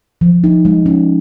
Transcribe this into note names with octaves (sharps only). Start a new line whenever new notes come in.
F3
D#4
G#3
C#4